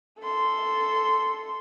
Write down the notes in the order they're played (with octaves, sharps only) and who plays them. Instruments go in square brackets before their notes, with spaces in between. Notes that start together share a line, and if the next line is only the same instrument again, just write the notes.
[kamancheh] A4 C6